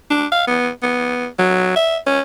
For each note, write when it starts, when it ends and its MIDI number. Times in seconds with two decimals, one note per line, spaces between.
0.10 0.26 62
0.32 0.42 77
0.47 0.70 59
0.82 1.27 59
1.39 1.73 54
1.76 1.97 76
2.07 2.21 61